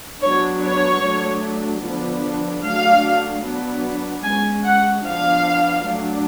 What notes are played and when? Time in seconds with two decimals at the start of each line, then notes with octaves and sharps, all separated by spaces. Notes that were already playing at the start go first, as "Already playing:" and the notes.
0.21 F#3 B3 D4 C#5
0.61 C#5
1.02 F#3 A3 D4
1.83 D3 F3 B3 D4
2.63 F#3 A3 D4 F5
3.43 F#3 B3 D4
4.23 G#3 C#4 G#5
4.64 F#5
5.04 F3 B3 D4 F5
5.85 F#3 A3 D4